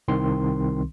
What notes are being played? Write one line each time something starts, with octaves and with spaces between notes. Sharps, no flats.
C2 D#3 C4 C6